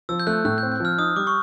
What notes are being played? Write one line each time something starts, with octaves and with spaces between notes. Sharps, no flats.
F3 E6
G6
A3 F#6
A2 F#6
G6
C4
G6
F3 F6
D#4 D#6
G3 D6
C#6